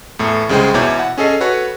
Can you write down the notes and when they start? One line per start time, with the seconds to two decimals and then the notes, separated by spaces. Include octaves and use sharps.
0.19 E2 A2 A3
0.49 C2 C#3 G#3 G#4 C5 G5
0.74 E2 B2 E4 C#5 D6 G6
0.99 F#5
1.18 C#4 G#4 A4 D#5 C7
1.41 F#4 A4 B4 C#5